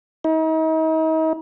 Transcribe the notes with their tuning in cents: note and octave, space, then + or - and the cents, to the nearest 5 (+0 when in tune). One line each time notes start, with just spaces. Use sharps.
D#4 +40